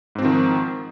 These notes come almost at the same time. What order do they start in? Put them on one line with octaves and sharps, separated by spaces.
G#2 C4 F3 D#3